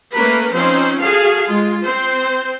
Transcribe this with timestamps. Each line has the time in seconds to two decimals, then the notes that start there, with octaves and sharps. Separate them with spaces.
0.15 A3 A#3 C#4 A#4 B4
0.53 F3 C4 C#4 D#4 C5
1.02 F#4 G#4 A4 F5
1.46 G#3 F4
1.84 C4 C5